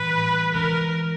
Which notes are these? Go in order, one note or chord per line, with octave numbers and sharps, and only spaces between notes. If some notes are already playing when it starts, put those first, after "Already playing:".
Already playing: A2 E3 G3 B4
E3 G#3 C#4 A#4